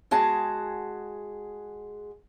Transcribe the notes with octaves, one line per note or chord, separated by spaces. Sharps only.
G#3 F#4 G#4 A5